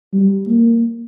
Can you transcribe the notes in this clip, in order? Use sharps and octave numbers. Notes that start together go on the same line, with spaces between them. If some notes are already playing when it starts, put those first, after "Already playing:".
G3
A#3